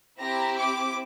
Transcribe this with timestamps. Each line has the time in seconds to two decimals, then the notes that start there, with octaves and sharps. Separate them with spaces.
0.20 C4 E4 G4 A#5
0.58 D6